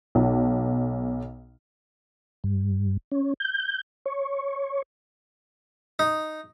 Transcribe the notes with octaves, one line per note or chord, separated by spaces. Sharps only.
B1
G2
C#4
G6
C#5
D#4